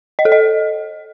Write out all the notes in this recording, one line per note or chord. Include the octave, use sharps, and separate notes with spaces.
D#5
A4
D#5